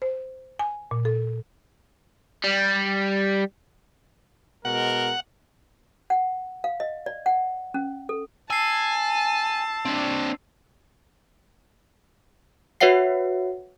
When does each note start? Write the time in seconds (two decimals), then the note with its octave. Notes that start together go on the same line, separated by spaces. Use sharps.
0.02 C5
0.59 G#5
0.91 A#2
1.05 A4
2.44 G3
4.65 B2 G#3 A#4 F#5
6.10 F#5
6.64 F5
6.80 D#5
7.06 D5
7.26 F#5
7.74 C#4
8.09 A4
8.50 G#5 A5 E6 C7
9.85 C4 D4
12.81 F#4 B4 C#5 E5 F#5 C7